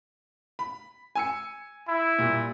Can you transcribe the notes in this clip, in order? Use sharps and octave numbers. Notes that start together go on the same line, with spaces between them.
B5
G#5 E6 C#7
E4
A#2 G3